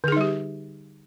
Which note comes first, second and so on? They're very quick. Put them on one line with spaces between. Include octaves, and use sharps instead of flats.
D3 G#4 D#4 G3 G4